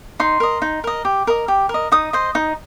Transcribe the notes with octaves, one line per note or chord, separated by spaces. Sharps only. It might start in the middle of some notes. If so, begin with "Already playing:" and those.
D#4 C6
A#4 D#5
D#4
A#4 D#5
G4
A#4 D#5
G4
A#4
D#5
D#4 D#6
C5 D#5
D#4